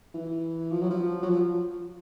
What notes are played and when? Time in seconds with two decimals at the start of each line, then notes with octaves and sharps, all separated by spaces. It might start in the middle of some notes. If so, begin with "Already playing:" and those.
0.14 E3
0.71 F3
0.81 F#3
0.90 F3
1.22 F#3
1.29 F3